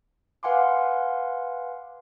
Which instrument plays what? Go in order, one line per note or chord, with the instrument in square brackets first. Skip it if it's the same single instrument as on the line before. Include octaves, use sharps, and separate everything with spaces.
[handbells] B4 F5 F#5 G#5 C6 D6